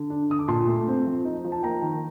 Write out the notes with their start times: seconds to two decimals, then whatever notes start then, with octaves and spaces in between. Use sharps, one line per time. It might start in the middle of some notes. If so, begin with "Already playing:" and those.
Already playing: D3
0.10 D4
0.30 D3 D#6
0.39 D6
0.48 A#2 A5 C6
0.67 A3
0.87 C4
1.05 F3
1.25 D#4
1.44 F3
1.52 A5
1.63 A#3 G5 A#5
1.82 D#3